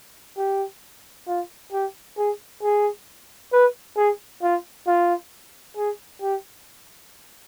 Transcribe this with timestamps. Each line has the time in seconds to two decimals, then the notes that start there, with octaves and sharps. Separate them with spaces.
0.38 G4
1.27 F4
1.73 G4
2.17 G#4
2.62 G#4
3.53 B4
3.97 G#4
4.42 F4
4.87 F4
5.77 G#4
6.22 G4